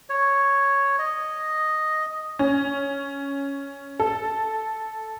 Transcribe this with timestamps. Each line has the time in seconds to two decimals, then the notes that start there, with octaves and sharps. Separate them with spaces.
0.09 C#5
0.99 D#5
2.39 C#4
4.00 A4